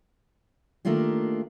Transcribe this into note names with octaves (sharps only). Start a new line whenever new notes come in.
D#3 A3 A#3 D4 F4 G4